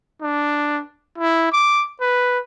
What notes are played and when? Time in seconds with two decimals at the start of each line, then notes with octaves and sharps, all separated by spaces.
0.22 D4
1.18 E4
1.52 D6
2.01 B4